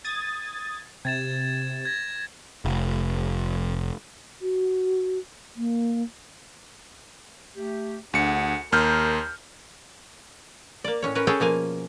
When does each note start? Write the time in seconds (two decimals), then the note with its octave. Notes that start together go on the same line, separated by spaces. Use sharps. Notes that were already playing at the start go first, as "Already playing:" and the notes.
0.05 D#6 G#6 A6
1.05 C3 G#6 A6 E7
1.85 G#6 A#6
2.65 F1
4.42 F#4
5.56 A#3
7.55 A3 G4
8.14 D2 D4 G#4 F#5 C#7
8.72 D#2 A#4 A#5 C6 F6 G6
10.84 A#3 D5
11.02 A2 C#4 C#5
11.15 C#4 A#4 B4
11.27 C#4 G#4 A4 C#5 G5
11.40 B2 F3 A#3 G#5